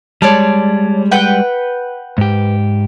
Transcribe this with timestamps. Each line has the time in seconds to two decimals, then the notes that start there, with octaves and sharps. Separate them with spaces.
0.22 G3 G#3 C#5 D5 A5
1.12 B4 F#5 G5
2.18 G#2 G4